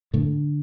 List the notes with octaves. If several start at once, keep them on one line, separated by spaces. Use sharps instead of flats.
A2 D3 A3